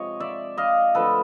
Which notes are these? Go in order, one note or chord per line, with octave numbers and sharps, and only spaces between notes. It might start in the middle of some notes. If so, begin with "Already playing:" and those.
Already playing: C3 F3 G#3 C#5 D#5
D5 E5
D#5 F5
D3 F3 A3 A4 B4